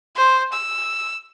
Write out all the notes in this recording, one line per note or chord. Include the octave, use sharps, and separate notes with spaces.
C5
E6